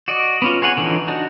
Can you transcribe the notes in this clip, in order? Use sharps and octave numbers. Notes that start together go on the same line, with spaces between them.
F#4 D5 D#5
B3 C#4 F4
G#4 C#5 F#5 G#5
D3 E3 F3 C#4 D#4
D4 D#4 F#4